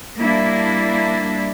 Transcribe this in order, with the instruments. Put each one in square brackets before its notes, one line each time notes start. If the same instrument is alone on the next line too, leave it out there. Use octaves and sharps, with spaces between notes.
[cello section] G3 A#3 D4 E4